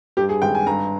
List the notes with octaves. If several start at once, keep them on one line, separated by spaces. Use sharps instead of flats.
G2 G4
G#4
G#1 G5
G#5
G2 A#5